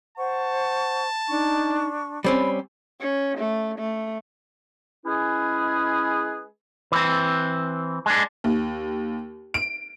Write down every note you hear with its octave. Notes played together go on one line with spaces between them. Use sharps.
C5 F#5 A5 C#6
D4 D#4 C#6
G3 C4 C#4 B5
C#4
A3
A3
G#3 C#4 E4 G#4 B4
E3 C4
G#3 D4
D#2
D7